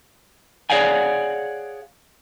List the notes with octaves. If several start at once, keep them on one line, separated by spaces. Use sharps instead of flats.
G#4 C#5 D5 F5 F#5 G#5